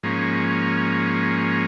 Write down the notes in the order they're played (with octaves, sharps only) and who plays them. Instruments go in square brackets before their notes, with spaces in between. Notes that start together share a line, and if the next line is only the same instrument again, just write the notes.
[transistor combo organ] G#2 F3 A#3 C#4